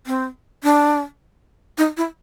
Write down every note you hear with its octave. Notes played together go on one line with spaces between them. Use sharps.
C4
D4
D#4
E4